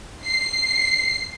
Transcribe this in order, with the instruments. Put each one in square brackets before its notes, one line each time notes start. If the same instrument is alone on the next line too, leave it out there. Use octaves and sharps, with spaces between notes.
[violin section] C7